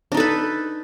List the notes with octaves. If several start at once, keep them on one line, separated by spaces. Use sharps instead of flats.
D4 D#4 A4 B4